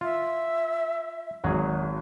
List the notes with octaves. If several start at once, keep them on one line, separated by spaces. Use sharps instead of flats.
F4 E5
G#1 F#3 G#4